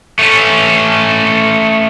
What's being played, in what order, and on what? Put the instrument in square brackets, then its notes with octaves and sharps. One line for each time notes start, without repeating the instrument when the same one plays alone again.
[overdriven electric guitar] A3 C#4